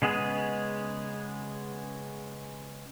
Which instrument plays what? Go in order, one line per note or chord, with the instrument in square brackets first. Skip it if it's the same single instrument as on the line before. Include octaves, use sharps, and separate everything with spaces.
[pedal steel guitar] C#3 G#3 B3 G#4